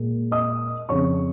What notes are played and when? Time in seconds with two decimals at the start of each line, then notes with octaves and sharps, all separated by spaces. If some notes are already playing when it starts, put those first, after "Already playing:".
Already playing: A#2 G#3
0.31 D#5 D#6
0.89 F2 C#3 F3 C#5 C#6